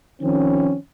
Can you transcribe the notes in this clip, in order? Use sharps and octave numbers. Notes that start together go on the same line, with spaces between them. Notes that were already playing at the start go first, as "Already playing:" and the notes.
D#3 F3 C4 C#4